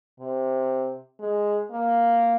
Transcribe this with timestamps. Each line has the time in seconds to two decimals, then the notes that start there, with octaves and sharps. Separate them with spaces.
0.20 C3
1.20 G#3
1.71 A#3